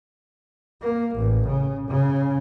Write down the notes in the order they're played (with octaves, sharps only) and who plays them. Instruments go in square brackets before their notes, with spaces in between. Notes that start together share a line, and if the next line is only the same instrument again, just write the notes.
[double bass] A#3
A1
C#3
C#3